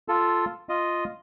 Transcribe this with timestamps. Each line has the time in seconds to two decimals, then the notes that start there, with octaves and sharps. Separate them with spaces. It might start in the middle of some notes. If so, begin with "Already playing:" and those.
0.08 F4 A4
0.69 F4 D#5